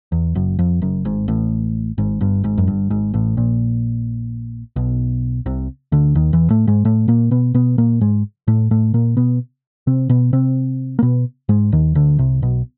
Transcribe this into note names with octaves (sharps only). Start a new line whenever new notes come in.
E2
F#1 F#2
F2
F#1 F#2
G#1 G#2
A1 A2
G#1 G#2
G1 G2
G#1 G#2
F#2
G1 G2
G#1 G#2
A1 A2
A#1 A#2
B1 B2
C2 C3
D2 D3
D#2 D#3
E2 E3
A2 A3
G#2 G#3
A2 A3
A#2 A#3
B2 B3
B2 B3
A#2 A#3
G#2 G#3
A2 A3
A2 A3
A#2 A#3
B2 B3
C3 C4
B2 B3
C3 C4
A#3
B2 B3
G#2 G#3
D#2 D#3
D2 D3
C2 C3
B1 B2